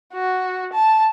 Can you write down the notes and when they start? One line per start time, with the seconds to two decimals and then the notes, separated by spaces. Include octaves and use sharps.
0.14 F#4
0.73 A5